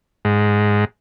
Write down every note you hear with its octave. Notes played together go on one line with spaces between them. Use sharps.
G#2